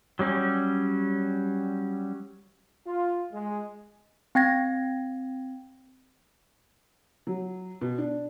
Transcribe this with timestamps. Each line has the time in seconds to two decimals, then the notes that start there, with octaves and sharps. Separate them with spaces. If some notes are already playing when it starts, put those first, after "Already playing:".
0.19 F#3 G3 C#4
2.86 F4
3.32 G#3
4.35 C4 G5 G#6 A#6
7.27 F#3
7.81 B2
7.98 D4